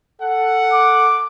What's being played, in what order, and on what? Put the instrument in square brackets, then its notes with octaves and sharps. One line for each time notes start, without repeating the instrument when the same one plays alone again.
[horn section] A4 F#5
[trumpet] D6